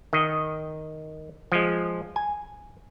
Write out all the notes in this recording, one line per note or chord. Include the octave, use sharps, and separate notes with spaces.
D#3 D#5
F3 G#3
G#5